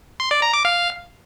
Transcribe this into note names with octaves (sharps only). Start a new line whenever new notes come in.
C6
D5
A#5
D6
F5